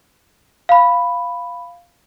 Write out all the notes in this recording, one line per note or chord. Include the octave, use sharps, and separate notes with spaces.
F5 B5